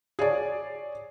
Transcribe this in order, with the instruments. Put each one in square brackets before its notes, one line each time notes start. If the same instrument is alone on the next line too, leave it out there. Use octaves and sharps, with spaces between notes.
[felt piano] G#4 C#5 D5